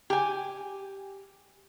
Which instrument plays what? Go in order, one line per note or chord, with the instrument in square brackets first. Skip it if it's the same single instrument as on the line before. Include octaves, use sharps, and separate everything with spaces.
[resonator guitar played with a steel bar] G4 G#5